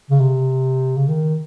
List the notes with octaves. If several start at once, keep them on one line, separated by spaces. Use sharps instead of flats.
C#3
C3
C#3
D#3